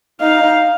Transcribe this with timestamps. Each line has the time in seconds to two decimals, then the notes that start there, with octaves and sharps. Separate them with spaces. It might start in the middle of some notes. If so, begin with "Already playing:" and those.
0.21 D#4 F5
0.41 D#4